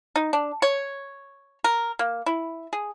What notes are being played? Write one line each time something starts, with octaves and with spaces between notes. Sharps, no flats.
D#4
D4
C#5
A#4
A#3
E4
G#4